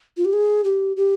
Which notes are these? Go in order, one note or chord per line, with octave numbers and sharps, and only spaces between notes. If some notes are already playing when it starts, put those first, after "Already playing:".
F4
G4
G#4
G4
G4